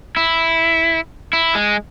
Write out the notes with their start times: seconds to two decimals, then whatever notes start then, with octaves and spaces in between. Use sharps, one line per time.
0.16 E4
1.33 E4
1.55 G#3